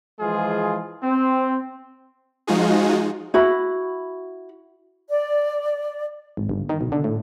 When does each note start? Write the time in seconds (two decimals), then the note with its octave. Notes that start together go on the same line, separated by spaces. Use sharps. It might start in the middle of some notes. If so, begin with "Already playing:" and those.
0.20 E3 F3 G#3 F4 G#4
1.03 C4
2.47 F3 G#3 D#4 F4 F#4 G#4
3.34 E4 F#4 B5
5.10 D5
6.37 G#1
6.49 G1
6.69 D#3
6.81 B1
6.92 D3
7.04 A2